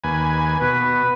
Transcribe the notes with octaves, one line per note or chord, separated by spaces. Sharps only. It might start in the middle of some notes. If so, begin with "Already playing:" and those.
D#2 B4 G#5
B2 B4